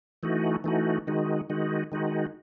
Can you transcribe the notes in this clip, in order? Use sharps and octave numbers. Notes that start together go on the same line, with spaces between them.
E3 A3 D#4 F#4
E3 A3 D#4 F#4
D#3 G#3 D#4 F#4
D#3 G#3 D#4 F#4
D#3 G#3 D#4 F#4